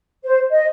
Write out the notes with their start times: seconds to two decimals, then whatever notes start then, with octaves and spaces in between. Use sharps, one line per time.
0.24 C5
0.52 D#5